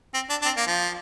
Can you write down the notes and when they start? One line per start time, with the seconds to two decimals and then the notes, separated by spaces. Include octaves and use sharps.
0.14 C4
0.30 D4
0.42 D4
0.45 C4
0.57 A#3
0.67 F3